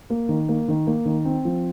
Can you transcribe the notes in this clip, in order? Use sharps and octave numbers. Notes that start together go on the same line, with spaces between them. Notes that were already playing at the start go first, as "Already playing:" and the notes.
A#3
D#3
A#3
D#3
A#3
D#3
C4
F3